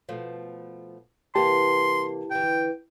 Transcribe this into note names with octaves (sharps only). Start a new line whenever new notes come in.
B2 F3 A3
C3 E3 A#3 G4 A5 C6
D3 E3 G5